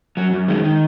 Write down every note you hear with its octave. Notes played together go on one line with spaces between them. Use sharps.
F#2 F#3
F#2
D#3 G#3
D#3